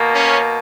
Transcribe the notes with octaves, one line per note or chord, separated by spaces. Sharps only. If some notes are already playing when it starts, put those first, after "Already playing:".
Already playing: B2 A#3
C#4